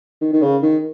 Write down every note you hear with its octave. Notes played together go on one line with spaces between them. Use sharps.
D#3
D#3
C#3
D#3